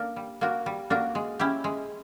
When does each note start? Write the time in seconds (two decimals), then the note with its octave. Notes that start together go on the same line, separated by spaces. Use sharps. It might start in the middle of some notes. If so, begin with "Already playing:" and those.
Already playing: A#3 D4 A#4
0.16 G3
0.41 A#3 D4 F#4 A#4
0.66 G3
0.90 A#3 D4 F#4 A#4
1.15 G#3
1.40 C#4 E4 G4
1.64 G#3